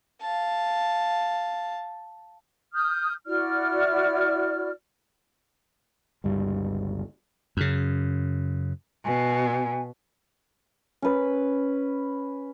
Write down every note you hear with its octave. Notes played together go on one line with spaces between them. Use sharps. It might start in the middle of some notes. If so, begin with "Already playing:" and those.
F5 A5
D#6 F6 G6
E4 F#4 D5 F6
G1 C#2 G2 G3
F#2 C#3
B2 G#5
C#4 B4